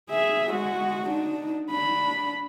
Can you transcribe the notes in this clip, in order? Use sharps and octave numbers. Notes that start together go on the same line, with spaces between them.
G#4 E5
G#3 F#4
D4 D#4
D4 B5